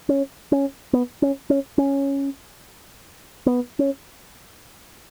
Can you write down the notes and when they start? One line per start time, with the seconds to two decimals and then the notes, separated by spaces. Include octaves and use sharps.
0.09 C#4
0.52 C#4
0.93 B3
1.22 C#4
1.50 C#4
1.78 C#4
3.46 B3
3.79 C#4